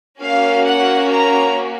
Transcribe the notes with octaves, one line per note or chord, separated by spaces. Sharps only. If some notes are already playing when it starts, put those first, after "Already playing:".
A#3 C#4 F#4 F5
F#5
A#5